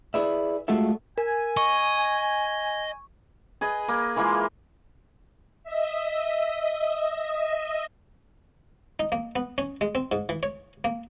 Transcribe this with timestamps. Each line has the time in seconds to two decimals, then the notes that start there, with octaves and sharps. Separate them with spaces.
0.14 E4 G#4 B4 D5 E5
0.68 G#3 A3 F4 F#4 A4 E5
1.18 A#4 G#5
1.57 D#5 C#6
3.61 G#4 B4 D#5
3.88 A#3
4.16 E3 G#3 A#3 F4
5.63 D#5 E5
8.99 D#4
9.12 A#3
9.36 B3
9.58 C#4
9.81 G#3
9.95 C4
10.12 G#2
10.29 E3
10.43 C#5
10.84 A#3